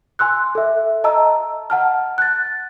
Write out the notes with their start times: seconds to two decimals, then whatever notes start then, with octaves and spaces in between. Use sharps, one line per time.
0.19 G#5 C6 E6 F#6
0.55 A4 E5
1.04 D#5 A5 A#5 E6
1.70 F#5 A5 F6
2.18 F#6 A6